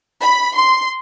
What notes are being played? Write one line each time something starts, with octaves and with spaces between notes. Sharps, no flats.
B5
C6